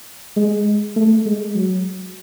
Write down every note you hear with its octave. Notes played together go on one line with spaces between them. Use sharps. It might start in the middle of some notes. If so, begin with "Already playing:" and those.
G#3
A3
G#3
F#3